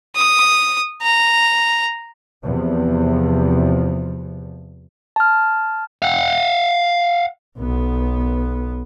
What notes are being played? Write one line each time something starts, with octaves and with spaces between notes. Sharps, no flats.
D#6
A#5
E2 C3 F3
A5 F6
F5 F#5
B1 B3